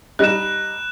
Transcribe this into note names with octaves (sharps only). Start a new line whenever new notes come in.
G3 D#4 F#6 E7